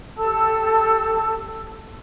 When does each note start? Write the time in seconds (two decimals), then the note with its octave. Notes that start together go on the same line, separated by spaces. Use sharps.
0.17 G4 A4 A5 E6